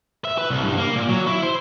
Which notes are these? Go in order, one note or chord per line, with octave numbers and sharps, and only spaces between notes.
E5
B4
C2
G2
A#3
A#2
F#3
E4
C5